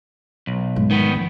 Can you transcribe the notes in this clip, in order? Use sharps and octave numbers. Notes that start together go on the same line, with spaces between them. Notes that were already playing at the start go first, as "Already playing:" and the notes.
B1
G#2 G#3
D#3 B3
F3